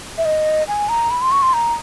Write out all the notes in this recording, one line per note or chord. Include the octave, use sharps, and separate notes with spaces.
E5
D#5
G#5
A#5
B5
C6
C#6
C6
A#5